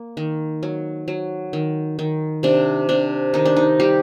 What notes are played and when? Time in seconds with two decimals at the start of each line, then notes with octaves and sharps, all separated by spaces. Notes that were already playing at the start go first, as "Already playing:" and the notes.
Already playing: A#3
0.17 D#3
0.63 F#3
1.08 F#3
1.53 D#3
1.99 D#3
2.43 C3 D4
2.89 C3 D4
3.34 D#3 D#4
3.45 D4
3.56 D#4
3.80 G3 G4